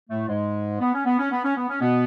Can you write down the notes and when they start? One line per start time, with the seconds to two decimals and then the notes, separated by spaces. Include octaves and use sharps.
0.10 A2 A3
0.28 G#2 G#3
0.80 B3
0.94 C#4
1.05 B3
1.19 C#4
1.31 B3
1.44 C#4
1.56 B3
1.69 C#4
1.81 B2 B3